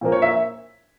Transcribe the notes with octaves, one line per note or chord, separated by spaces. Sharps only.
A#2 F3 A#3
C#5
E5